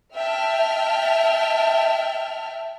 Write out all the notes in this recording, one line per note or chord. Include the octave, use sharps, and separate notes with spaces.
E5 G5 A5 F6